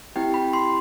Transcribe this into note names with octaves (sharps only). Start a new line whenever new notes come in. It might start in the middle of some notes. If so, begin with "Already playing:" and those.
C4 E4 G4 G5
B5
C6